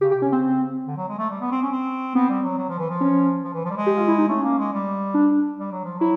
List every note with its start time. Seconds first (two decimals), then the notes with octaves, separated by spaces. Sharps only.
0.01 C#3 G4
0.11 G4
0.14 C3
0.22 C#4
0.26 C#3
0.32 C4
0.86 D3
0.97 F#3
1.08 G#3
1.18 A3
1.30 G3
1.40 B3
1.51 C4
1.62 C#4
1.72 C4
2.15 B3 C4
2.29 G3
2.43 F#3
2.57 F#3
2.69 F3
2.79 E3
2.89 F3
3.01 C#4
3.44 F3
3.54 E3
3.65 F3
3.70 G3
3.76 G#3
3.86 G4
3.97 F4
4.08 E4
4.18 D#4
4.29 A3 C#4
4.43 A#3
4.58 G#3
4.73 G3
5.14 D4
5.58 G3
5.71 F#3
5.84 F3
5.98 F#3 E4